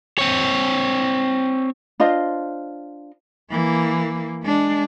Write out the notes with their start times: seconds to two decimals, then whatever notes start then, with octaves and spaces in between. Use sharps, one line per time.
0.19 C4 C#5
2.00 D4 F4 C5 D#5
3.51 E3 A#3
4.43 G#3 D4